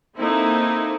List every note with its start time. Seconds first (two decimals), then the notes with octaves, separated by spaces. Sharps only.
0.18 A#3 C4 D#4 E4 A4